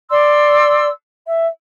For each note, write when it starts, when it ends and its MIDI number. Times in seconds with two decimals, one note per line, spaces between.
0.09 0.87 74
0.09 0.87 84
0.09 0.87 88
1.24 1.45 76